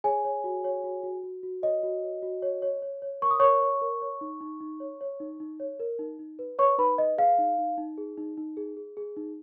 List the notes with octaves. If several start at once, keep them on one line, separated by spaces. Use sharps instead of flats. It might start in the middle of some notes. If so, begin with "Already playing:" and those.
G#4 C#5 G#5
C#5
F#4
C#5
F#4
F#4
F#4
F#4
C#5 D#5
F#4
C#5
F#4
C#5
C#5
C#5
C#5
A#4 C#6
D#6
A#4 C#5 C#6
C#5
A#4
C#5
D#4
D#4
D#4
C#5
C#5
D#4
D#4
C#5
A#4
D#4
D#4
B4
B4 C#5 C#6
D#4 B4 B5
B4 D#5
G#4 F5
D#4
D#4
D#4
G#4
D#4
D#4
G#4
G#4
G#4
D#4